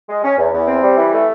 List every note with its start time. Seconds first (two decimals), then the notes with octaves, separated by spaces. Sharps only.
0.09 G#3
0.24 C#4
0.38 E2
0.54 E2
0.67 C4
0.82 G3
0.97 E3
1.13 A3